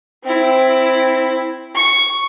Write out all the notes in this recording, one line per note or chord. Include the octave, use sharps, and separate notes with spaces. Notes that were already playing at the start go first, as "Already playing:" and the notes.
C4 E4
C#6